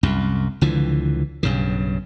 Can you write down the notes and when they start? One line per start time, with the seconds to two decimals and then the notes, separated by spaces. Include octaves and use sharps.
0.03 C2 F#2
0.61 C#2 D3 E3 F3
1.43 B1 G2 C#3